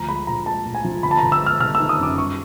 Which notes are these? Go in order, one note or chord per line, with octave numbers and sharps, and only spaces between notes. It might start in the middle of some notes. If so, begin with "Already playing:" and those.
Already playing: D2 F3 A#5
G#3 B5
A#1 A#5
G#3 A5
A#1
G#5
F3
G1 B5
A5
G1 A#5
E6
G#3
F6
G1 F6
E6
D#3
D#6
F#2 D6
G3 C#6